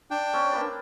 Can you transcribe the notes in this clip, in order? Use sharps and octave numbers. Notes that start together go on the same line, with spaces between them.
D4 G5
C4 C#4 A5
A#3 B4 D5